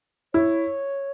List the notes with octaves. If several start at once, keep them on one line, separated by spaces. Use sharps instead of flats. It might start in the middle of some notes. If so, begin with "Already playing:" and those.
E4 C#5